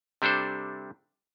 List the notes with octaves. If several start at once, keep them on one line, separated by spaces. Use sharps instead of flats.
C3 G3 D4 A4 C5